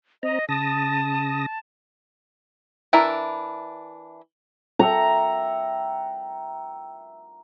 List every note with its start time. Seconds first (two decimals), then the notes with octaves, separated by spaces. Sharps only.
0.23 C4 D#5 A#5
0.49 C#3 A5 D#6 A#6
2.93 E3 D4 E4 A#4 E5
4.79 E5 F#5 G5 A#5